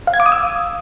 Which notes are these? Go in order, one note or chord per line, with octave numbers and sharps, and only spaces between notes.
F5
G#6
D6
D#6
E6